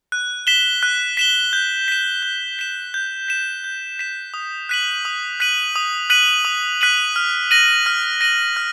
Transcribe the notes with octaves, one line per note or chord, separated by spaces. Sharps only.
F#6
B6 E7 G7
F#6
B6 E7 G7
G6
B6 E7
G6
B6 E7
G6
B6 E7
G6
B6 E7
D#6
F#6 B6 D#7 F#7
D#6
F#6 B6 D#7 F#7
D#6
F#6 B6 D#7 F#7
D#6
F#6 B6 D#7 F#7
F6
A#6 D#7 F#7
F6
A#6 D#7 F#7
F6